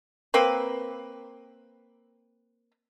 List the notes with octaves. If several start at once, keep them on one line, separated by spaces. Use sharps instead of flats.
A#3 C4 B4